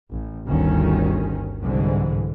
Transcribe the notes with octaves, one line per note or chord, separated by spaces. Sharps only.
A1
G1 D2 D#3 C#4
C2 G#2 D3 E3